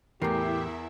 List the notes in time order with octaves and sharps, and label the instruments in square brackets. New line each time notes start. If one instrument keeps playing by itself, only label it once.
[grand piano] E2 A#4 C7 [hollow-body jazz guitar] A2 E3 [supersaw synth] E4 E5 [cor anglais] G4